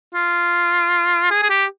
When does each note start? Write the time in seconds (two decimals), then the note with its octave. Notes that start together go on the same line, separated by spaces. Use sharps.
0.15 F4
1.31 G#4
1.43 G#4
1.50 G4